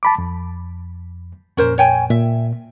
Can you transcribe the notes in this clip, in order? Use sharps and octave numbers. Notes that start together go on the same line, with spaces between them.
A5 B5 D6
F2
F2 A#2 C#4 A#4 C5
C#5 G5 G#5
A#2 E5